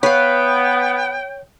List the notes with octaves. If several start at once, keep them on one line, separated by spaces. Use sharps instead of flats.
B3 B4 C#5 F5 G5